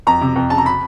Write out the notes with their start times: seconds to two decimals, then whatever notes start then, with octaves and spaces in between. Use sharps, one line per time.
0.07 F2 A#5
0.21 C3
0.36 F2
0.50 C#3 A5
0.58 A#5
0.66 B5